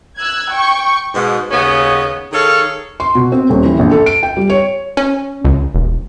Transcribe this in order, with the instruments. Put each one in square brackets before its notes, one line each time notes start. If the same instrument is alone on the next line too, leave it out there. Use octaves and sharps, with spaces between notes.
[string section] E6 F#6 G#6
G5 C#6
[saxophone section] G#2 B2
D#2 C#3 B3 C#4 D#5
D#3 G#4 A4 C#5 F5
[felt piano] C6
B2
C4
D#1
E3
A#1
A4
D7
G5
G3
C#5
[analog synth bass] C#4
C#2
E1